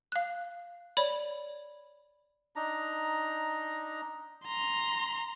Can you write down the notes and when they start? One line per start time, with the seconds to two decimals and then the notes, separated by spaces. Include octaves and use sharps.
0.12 F5 F#6
0.97 C#5 D5 B5
2.56 D4 D#4 A#5
4.46 A#5 C6